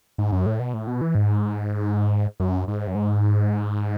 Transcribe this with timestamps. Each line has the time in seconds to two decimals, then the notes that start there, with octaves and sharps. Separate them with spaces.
0.18 G#2
0.32 F#2
0.46 A2
0.60 B2
0.74 A2
0.87 B2
1.01 E3
1.15 G#2
2.40 F#2
2.68 G#2
2.87 F#2
2.95 G#2